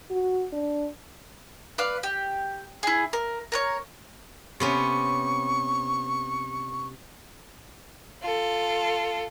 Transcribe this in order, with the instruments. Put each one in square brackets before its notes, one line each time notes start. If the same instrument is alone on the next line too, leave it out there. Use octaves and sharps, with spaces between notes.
[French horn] F#4
D4
[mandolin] B4 D5 F5
G4
E4 G#4
A#4
A#4 B4 C#5
[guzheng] C3 B3 C#4 [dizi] C#6
[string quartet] F4 A4